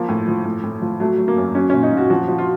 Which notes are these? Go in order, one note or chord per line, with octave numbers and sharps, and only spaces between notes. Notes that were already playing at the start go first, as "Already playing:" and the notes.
Already playing: F3 A#3
A2
F3
A2
A2
F3
F#3 A3
F#3
A#3
F#2
F#3 C#4
A#2 C#4
D#4
A#2 F#4
F3 F#4
F3 F#4
F4